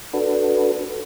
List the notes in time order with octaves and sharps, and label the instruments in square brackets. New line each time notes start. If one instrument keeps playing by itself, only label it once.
[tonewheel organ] D4 F#4 A4 B4